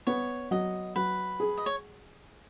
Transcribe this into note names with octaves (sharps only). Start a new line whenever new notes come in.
B3 C#5
F#3 D#5
F#3 B4
G#4
D#5
C#5